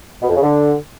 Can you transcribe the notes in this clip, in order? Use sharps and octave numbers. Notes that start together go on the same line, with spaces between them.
B2
F2
C#3
D3